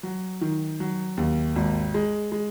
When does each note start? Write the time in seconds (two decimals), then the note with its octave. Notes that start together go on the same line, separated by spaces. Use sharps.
0.03 F#3
0.41 D#3
0.80 F#3
1.17 D#2
1.56 G#1
1.94 G#3
2.32 G#3